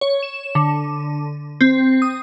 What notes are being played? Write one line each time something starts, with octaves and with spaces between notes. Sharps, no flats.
C#5
E7
D3
C4
D#6